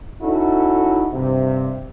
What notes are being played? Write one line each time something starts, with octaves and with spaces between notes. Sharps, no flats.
C#4 D#4 E4 F#4 A4
G2 C3